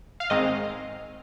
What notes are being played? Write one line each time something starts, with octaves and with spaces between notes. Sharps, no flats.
F5
G#2 D#3 G#3 C4 D#5